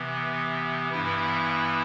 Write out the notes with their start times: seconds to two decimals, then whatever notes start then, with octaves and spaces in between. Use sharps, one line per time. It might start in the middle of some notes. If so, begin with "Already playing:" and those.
Already playing: C3 E3 B3
0.92 G2 E3 B3 E4